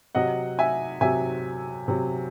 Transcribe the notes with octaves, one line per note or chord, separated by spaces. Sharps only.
C3 F#3 D#5 F#5
E5 G#5
C3 F#3 E5 G#5
C3 F#3